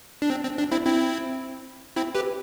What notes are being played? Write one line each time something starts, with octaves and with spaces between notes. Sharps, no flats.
D4
C4
C4
D4
C4 E4
C4 E4
C4 E4
G4 B4